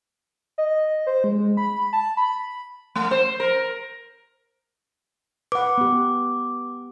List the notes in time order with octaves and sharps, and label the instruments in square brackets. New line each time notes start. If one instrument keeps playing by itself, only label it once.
[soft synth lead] D#5
C5
G#3
G#3
B5
A5
B5
[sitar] A3
C5
A#4
[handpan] B4 F#5 [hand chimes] D6
[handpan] B3 G4